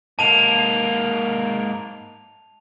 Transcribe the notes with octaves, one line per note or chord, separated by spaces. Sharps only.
G#2 A#3 A5 D#7 F7